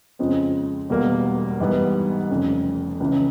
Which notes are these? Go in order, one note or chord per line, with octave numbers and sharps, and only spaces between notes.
F2 C#3 F3 G#3 C4
E1 E2 B2 G3 A#3
G#2 E3 G3 B3
F1 F2 C#3
C#2 C#3 E3